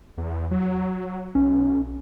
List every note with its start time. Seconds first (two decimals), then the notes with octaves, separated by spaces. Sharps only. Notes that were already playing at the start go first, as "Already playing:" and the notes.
0.17 E2
0.51 F#3
1.35 B1 C#4